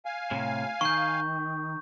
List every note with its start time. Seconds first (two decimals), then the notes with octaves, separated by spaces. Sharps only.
0.06 F5 G#5
0.31 A2 C3
0.81 D#3 C#6 G6